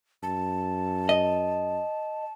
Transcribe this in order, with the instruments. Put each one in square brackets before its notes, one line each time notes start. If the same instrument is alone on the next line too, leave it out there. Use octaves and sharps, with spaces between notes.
[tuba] F#2 [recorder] A5
[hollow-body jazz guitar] D#5